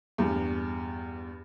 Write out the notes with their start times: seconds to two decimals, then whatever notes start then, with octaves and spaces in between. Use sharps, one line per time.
0.18 E2 G2